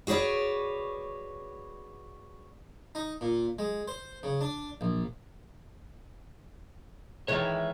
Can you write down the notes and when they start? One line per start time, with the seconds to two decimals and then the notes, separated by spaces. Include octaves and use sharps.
0.07 F#4 G#4 B4 C#5 D5
2.95 D#4
3.21 A#2
3.59 G#3
3.88 C5
4.23 C#3
4.41 D4
4.81 A#1
7.28 D#3 E3 G#3 C#5 E5